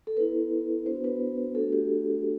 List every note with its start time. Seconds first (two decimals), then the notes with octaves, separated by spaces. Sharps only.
0.07 A4
0.17 B3 E4 B4
0.86 B3 D4 F#4 C5
1.04 B4
1.55 A3 D4 F#4 A4
1.73 G4